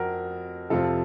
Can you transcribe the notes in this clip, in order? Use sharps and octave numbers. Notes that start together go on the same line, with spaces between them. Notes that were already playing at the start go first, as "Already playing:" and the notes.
Already playing: F2 F#4 A#4
F2 C3 F3 F4 A4